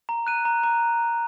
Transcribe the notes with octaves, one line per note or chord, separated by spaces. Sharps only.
A#5
F#6 D#7
A#5
A#5